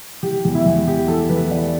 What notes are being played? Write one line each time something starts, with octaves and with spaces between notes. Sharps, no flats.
E3 G4
E2
E4
E2
E3 G4
E3 A4
E3 B4
E3 D5